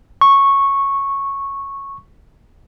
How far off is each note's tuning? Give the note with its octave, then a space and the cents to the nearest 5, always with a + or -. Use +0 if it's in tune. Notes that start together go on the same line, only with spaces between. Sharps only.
C#6 -10